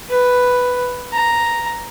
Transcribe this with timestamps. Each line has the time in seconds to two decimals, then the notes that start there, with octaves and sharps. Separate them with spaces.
0.10 B4
1.13 A#5